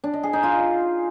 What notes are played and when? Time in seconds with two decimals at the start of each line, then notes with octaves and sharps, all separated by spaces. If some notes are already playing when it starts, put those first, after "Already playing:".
0.04 D4
0.13 D#5
0.23 G#4
0.33 D#4
0.43 F4